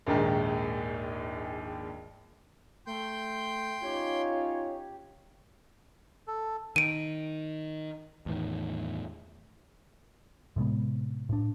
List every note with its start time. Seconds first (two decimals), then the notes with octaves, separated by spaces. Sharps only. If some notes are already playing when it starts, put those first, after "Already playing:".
0.07 A#1 D#2 G#2 D#3
2.87 A3 G5 C6 G6
3.83 C#4 D#4 F4 G4 C#5
6.27 A4
6.76 D#3 D7 D#7
8.26 E2 A2 D#3
10.56 A2 C3 G#3 B3
11.29 A2 D4